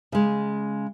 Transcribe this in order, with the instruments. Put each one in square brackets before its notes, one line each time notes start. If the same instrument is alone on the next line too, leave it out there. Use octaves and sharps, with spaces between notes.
[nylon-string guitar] C#3 G#3